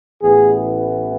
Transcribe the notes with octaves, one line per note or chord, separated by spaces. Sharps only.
A1 A2 E3 B3 G#4